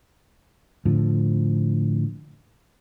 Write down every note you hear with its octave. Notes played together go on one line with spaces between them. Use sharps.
A2 D3 F3